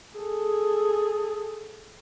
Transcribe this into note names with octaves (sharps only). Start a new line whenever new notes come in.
G#4 A4